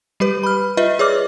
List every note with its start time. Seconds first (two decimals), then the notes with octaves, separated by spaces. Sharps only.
0.20 G3 G4 B4
0.43 B5 F6
0.77 F4 B4 D#5 E5
0.99 G#4 C#5 D5 D6 F6